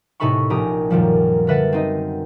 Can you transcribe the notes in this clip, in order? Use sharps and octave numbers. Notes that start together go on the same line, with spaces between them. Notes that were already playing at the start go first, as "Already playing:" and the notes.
A2 C3 D#4 A4 B5 C#6
A#1 C#4 G4 A#5 D#6
F#2 A#2 D#3 F3 G3
D3 A#4 B4 E5 F#5 A6
C4 D#4 D#5